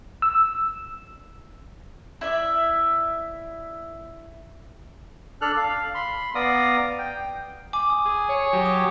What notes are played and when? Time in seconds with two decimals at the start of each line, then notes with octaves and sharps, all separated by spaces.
0.22 E6
2.21 E4 D5 E5
5.41 D4 A4 F6 F#6
5.57 F5
5.95 B5 C6
6.35 B3 D5 F5 A#5 D#6
6.99 G5
7.73 G#5 D6
7.90 D#6
8.06 G#4
8.29 C#5
8.53 F#3 G4
8.65 D#6